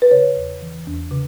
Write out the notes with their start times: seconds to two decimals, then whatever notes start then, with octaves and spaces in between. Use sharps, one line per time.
0.02 B4
0.11 C#3 C#5
0.36 E2
0.62 E3
0.87 E2
1.11 C#3